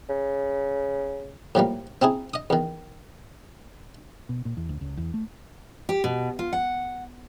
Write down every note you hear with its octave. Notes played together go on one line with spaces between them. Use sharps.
C#3
A2 F3 G3 A#3
C4 D#4 E4 G#4
D#5 D#6
E2 D#3
B2
A#2
E2
D2
C#2
E2
A3
G4
B2
F4
F#5